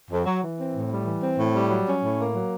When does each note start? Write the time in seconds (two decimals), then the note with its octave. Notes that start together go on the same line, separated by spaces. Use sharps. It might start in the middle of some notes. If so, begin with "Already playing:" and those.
0.10 F2
0.25 F#3
0.41 E3
0.58 C4
0.74 A2
0.90 G3
1.06 E3
1.22 C4
1.38 A2
1.54 G3
1.70 F#3
1.86 C#4
2.02 A2
2.19 A#3
2.35 F#3